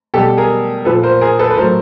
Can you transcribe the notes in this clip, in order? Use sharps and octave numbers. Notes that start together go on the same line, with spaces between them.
B2 G3 G4 A4
G#4 A#4
A#2 F3 A4 B4
A#4 C5
G#4 A#4
A4 B4
B4
A2 F#3 A#4 C5